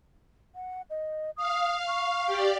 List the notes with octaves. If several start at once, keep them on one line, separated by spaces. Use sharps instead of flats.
F#5
D#5
F5 D#6
C#6
G4 D5